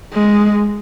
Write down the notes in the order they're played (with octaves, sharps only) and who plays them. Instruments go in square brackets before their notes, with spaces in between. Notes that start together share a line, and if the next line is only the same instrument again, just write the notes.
[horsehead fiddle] G#3